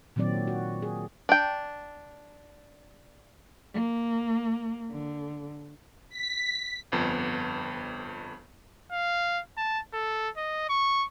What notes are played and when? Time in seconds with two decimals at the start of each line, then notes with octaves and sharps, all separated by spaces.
0.16 A#2 D#3 F#3 C4 D5
0.47 F#4
0.82 G#4
1.29 D4 G5
3.74 A#3
4.91 D3
6.09 B6
6.92 G1 F2 B3
8.92 F5
9.57 A5
9.93 A4
10.37 D#5
10.69 C#6